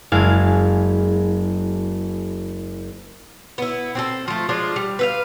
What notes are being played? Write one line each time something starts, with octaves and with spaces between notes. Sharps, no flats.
F#1 G#3 E4 G#4 F5 A5
B3 E4
C4 D4 A4
F3 A3
F3 G#3 D4 F4
G3
B4 E5 F5